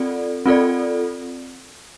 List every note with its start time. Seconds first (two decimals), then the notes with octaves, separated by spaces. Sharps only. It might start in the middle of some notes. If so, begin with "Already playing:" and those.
Already playing: C4 F4 A4 D5
0.46 C4 F4 A4 D5